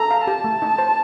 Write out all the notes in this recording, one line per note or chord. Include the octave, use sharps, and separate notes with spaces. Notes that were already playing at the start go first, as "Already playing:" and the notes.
Already playing: A4 A#5
F5
G4 A5
A3
D#4
C5